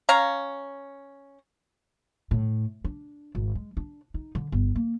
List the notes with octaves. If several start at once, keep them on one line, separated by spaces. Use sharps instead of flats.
C#4 F5 A#5
A2
D4
G#1
G#3
D4
D#4
D3
G1
A#3